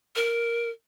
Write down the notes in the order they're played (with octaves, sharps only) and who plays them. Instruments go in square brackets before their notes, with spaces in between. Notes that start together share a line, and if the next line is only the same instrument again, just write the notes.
[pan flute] A#4